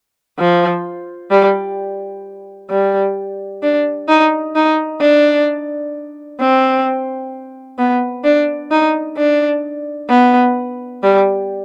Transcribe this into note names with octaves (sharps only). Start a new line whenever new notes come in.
F3
G3
G3
D4
D#4
D#4
D4
C4
B3
D4
D#4
D4
B3
G3